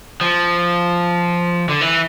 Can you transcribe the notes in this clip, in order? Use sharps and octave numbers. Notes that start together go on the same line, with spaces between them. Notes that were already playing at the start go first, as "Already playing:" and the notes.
F3
D3
E3